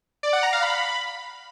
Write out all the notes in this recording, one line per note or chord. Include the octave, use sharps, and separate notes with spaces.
D5
F#5
A#5
F5
B5